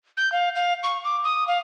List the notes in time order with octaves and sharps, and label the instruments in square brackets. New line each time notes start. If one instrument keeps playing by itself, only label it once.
[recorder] G6
F5
F5
C#6
D6
D#6
F5